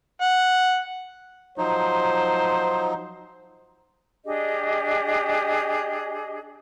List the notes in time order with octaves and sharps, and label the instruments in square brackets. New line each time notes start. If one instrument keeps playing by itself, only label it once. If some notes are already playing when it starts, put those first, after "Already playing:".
[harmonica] F#5
[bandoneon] F3 F#3 D#4 [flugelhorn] C5
[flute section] D4 G4 G#4 D#5